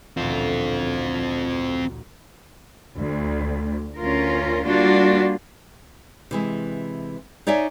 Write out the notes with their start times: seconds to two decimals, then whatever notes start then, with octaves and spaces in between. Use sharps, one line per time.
0.17 A1 D2 A#2 C4 F4
2.95 D2
3.96 D2 C#4 F4 A#4
4.64 G3 A#3 D4 F4 F#4
6.31 C3 E3 G#3
7.47 D#4 C#5 D5 E5 G#5